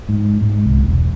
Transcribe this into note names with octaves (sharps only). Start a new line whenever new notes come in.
G#2
G#2
C2
E1